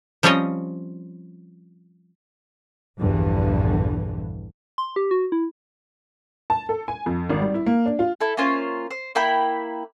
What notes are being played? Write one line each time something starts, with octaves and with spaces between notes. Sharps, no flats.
F3 G3 C4 C#4 C#5 D#5
A#1 E2 G2 D3 E3
C6
G4
F#4
E4
A5
A4
G#5
F2
G#1
G3
E4
A#3
D4
F4
E4 A4
A#3 C#4 F4 C5
C5
A#3 E4 G5 B5